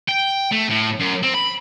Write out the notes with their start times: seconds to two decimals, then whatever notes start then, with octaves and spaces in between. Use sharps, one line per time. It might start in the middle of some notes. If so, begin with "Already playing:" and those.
0.08 G5
0.52 A3
0.69 A2
0.99 F#2
1.23 C4
1.34 B5